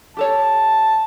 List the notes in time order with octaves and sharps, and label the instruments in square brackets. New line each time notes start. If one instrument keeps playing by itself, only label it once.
[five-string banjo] G4 A4 C#5 [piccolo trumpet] A5